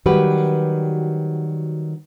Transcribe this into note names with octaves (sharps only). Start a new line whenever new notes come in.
D#3 F#3 G3 F#4 G4 B4